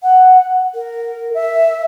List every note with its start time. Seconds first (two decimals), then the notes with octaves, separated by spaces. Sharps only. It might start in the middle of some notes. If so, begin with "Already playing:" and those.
0.03 F#5
0.75 A#4
1.34 E5